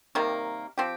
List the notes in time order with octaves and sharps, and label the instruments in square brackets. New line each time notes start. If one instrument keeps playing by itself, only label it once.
[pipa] C3 D#3 G3 A#3
F3 C4 G4